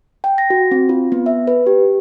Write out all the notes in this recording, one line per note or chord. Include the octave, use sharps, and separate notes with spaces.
G5
A#6
F#4
C4
F4
B3
E5
B4
G4